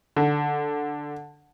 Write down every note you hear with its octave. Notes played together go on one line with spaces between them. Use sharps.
D3